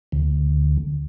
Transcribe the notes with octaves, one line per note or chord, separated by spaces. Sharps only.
D2